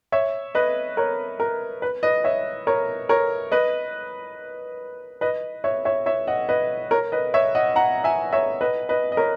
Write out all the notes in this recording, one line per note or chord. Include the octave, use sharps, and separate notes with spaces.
C#5 E5
B4 D#5
A#4 C#5
A#4
B4
B4 D#5
C#5 E5
A#4 C#5
A#4 C#5
B4 D#5
B4 D#5
C#5 E5
C#5 E5
C#5 E5
D#5 F#5
B4 D#5
A#4 C#5
B4 D#5
C#5 E5
D#5 F#5
F#5 A#5
E5 G#5
C#5 E5
B4 D#5
B4 D#5
D#5
A#4 C#5